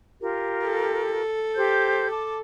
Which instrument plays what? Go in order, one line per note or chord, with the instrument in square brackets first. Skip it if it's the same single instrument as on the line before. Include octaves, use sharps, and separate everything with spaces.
[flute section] F4 G4 A#4
[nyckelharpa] A4
[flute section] G4 C5 G6
A5 D6